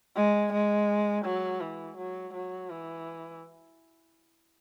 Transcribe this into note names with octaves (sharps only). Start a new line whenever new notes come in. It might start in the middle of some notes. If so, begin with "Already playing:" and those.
G#3
G#3
F#3
E3
F#3
F#3
E3